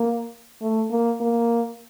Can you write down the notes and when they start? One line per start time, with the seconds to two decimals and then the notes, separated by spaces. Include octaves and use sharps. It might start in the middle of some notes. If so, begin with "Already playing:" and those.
Already playing: A#3
0.61 A3
0.91 A#3
1.20 A#3